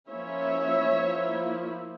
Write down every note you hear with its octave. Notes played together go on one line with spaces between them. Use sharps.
F3 A#3 C#4 E4 C#5 E5
F3 A#3 E4